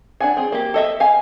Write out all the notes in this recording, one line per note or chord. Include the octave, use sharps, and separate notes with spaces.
D4 F#5 G#5
C4 G#4
A#3 G4
A4 D#5 E5
F5 G#5